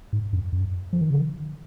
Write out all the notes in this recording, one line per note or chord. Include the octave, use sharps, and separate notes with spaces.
G#2
F#2
F#2
F3
D#3
C#3
D#3